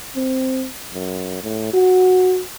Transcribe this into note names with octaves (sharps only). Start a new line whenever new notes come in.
C4
F#2
A2
F#4